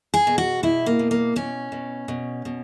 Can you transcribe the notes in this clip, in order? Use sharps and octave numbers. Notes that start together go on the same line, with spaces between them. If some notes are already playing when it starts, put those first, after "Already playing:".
G#4
B2
F#4
B2 E4
A#3
B2
A#3
B2 C#4
B2
B2
B2